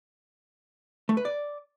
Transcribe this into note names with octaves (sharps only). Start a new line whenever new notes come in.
A3
B4
D5